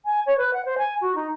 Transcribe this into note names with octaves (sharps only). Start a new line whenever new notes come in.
G#5
C#5
B4
F#5
C5
G#5
F#4
D#4